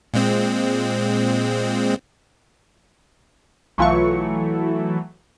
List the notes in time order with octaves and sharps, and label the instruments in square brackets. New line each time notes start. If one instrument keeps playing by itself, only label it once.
[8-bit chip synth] A#2 G#3 C4
[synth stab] B1 F4 C#6 [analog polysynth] E3 F#3 A3